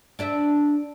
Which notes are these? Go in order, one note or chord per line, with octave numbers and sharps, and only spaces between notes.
D4 D5 E5